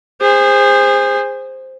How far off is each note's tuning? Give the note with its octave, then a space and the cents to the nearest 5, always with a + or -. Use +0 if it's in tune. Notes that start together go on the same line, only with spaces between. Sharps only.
G#4 -30 C5 +0